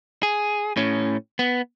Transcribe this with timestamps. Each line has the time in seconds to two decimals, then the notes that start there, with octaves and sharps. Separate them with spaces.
0.23 G#4
0.77 A2 C#4
1.39 B3